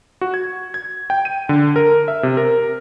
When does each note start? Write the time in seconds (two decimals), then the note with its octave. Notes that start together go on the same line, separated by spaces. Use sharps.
0.21 F#4
0.34 G#6
0.74 G#6
1.10 G5
1.25 D#7
1.49 D3
1.76 A#4
2.08 E5
2.23 C3
2.37 A#4